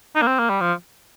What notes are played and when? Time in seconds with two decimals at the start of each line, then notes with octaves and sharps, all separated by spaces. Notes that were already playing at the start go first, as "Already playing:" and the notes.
0.16 D#4
0.22 A#3
0.27 C4
0.39 A#3
0.50 G3
0.61 F3